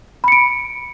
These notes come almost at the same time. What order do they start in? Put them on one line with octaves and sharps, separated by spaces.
B5 C#7 D7